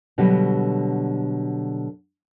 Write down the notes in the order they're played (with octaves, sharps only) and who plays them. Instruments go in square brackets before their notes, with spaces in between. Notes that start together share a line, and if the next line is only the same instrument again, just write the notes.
[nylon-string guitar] B2 D3 F#3 G3